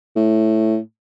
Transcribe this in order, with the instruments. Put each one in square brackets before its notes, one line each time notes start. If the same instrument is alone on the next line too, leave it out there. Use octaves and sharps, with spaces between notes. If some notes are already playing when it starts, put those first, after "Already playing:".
[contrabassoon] A2